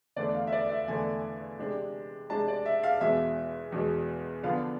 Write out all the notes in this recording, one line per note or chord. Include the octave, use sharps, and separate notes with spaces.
E2 D3 A3 D4 D5
F5
E5
D5
E5
E2 D3 A3 D4 G#5
C3 G#3 D4
C3 G#3 D4 A5
D5
E5
F5
E2 B2 G#3 E5
E2 B2 G#3
D3 F3 B3 D4 F5